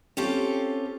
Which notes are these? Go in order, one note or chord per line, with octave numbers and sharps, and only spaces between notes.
C4 C#4 F4 G4 A4